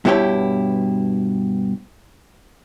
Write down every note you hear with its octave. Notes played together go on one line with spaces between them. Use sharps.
G2 B2 E4 G4 C#5